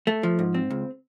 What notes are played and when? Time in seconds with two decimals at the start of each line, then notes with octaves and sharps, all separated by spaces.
0.07 A3
0.23 F3
0.39 G#2
0.54 C4
0.71 C#2